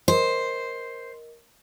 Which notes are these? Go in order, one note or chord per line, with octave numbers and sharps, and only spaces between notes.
A#4 C5 D#5